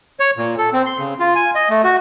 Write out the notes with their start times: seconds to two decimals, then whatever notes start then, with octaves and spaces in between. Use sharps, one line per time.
0.20 C#5
0.37 A#2
0.58 A4
0.73 C4
0.86 C6
0.99 C#3
1.20 F4
1.35 G#5
1.55 D#5
1.70 A3
1.84 F#4